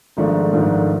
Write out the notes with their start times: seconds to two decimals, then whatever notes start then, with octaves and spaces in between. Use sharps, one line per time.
0.17 G#1 G#2 F3 A3 D4
0.53 G#1 G#2 F3 A3 D4